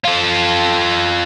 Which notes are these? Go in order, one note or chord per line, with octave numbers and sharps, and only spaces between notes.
F4 A4